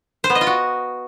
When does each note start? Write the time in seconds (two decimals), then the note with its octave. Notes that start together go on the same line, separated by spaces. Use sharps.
0.24 C5
0.30 B3
0.35 D#5
0.41 F4
0.47 F#4